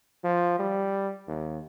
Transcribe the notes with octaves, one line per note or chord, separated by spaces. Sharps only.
F3
G3
D#2